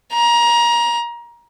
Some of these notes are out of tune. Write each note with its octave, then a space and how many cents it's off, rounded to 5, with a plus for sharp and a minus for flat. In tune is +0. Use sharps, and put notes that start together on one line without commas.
A#5 +25